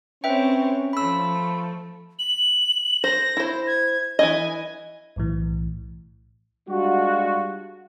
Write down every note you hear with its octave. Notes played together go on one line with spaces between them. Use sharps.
C4 C#4 B4 C#5 E5 G5
F3 A3 B5 E6
F#7
C5 A#6
E4 C5
G#6
E3 C4 D#5 G#5
B1 A2 E3
G3 G#3 D4 F4 F#4